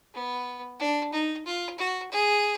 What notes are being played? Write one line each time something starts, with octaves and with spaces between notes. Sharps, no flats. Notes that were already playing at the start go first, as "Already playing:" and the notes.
B3
D4
D#4
F4
F#4
G#4